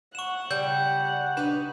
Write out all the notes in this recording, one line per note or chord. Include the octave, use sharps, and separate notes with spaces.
F#5 C#6 E7
C#3 G3 G6
D4 D#4 B4